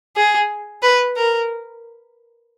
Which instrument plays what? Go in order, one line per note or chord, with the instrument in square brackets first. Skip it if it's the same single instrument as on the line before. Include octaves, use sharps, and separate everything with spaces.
[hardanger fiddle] G#4
B4
A#4